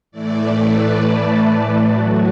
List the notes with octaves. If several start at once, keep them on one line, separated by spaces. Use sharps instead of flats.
A2 E3 A3 D5
B4
A4
A4
A2 F#3 A3 F#4